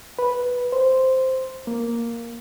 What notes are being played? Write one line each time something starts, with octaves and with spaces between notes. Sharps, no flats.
B4
C5
A#3